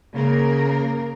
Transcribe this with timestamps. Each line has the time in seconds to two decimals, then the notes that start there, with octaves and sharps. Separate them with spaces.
0.13 C#3 A#3 A#4